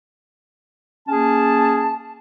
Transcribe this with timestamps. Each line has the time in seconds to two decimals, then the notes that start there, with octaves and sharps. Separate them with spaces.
1.08 A#3 C#4 G#4 A5